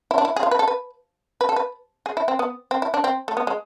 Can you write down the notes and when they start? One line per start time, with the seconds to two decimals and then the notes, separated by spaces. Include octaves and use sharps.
0.11 E4
0.18 D4
0.25 E4
0.36 G#4
0.43 F4
0.51 B4
0.59 A4
0.68 B4
1.41 B4
1.49 A4
1.56 B4
2.06 G#4
2.17 E4
2.28 C4
2.39 B3
2.71 C4
2.82 E4
2.94 D4
3.04 C4
3.28 A3
3.37 B3
3.47 G#3